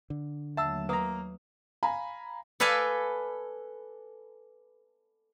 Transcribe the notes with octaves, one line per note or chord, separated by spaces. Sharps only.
D3
D#2 F#3 A3 E5 F#5 A5 E6
A#3 B4 F#5 A#5 D#6
F5 G#5 A#5 B5
A4 B4 D5 F5 G#5